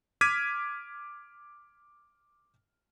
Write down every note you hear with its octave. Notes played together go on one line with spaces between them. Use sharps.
D6 F6 G#6 B6 D#7